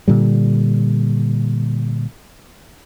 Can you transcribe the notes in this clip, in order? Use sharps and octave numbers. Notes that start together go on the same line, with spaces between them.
A#2 D3 G3